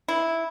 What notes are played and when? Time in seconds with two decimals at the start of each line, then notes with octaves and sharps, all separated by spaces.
0.08 E4